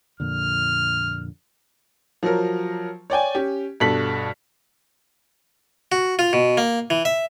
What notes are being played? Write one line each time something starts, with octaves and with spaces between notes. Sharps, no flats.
F2 A#2 D3 F6
F3 F#3 A#4
C#5 D5 G5 G#5
C#4 G4
G2 B2 A4 B6 F#7
F#4
F4
B2
A#3
E3
E5